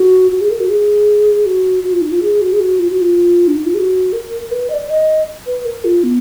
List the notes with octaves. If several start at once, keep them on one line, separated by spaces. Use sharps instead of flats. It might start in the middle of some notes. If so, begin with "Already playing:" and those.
Already playing: F#4
F#4
G#4
A#4
F#4
G#4
F#4
F#4
F4
D#4
F4
G#4
F#4
G#4
F#4
F4
F#4
F4
D4
D#4
F4
G#4
F#4
A#4
B4
D#5
D5
D#5
B4
A#4
F4
B3